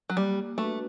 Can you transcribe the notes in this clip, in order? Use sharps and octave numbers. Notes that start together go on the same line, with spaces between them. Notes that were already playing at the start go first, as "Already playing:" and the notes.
F#3
G3 A#3
A3 D4 F#4 B4